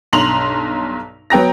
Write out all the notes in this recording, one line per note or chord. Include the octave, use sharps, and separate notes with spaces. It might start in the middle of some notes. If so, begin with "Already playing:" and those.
B1 G2 A#5 C6 F7 F#7
F#3 B3 G5 A#5 A#6